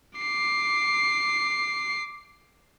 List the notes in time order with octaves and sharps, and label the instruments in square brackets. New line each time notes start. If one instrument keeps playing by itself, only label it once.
[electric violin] D6 C7